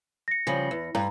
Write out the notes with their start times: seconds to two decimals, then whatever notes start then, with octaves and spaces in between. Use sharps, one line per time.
0.28 A#6 C#7
0.47 C#3 F3 G3
0.71 E2
0.95 G2 A#5